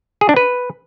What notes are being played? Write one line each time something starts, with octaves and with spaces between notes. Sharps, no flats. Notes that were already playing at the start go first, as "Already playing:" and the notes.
G#4
D4
B4